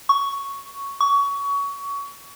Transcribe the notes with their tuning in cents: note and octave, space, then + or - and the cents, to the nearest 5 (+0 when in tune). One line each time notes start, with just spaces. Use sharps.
C#6 +5
C#6 +25